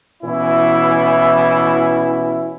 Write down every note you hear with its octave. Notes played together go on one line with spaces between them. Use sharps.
B2 E3 C#4 E4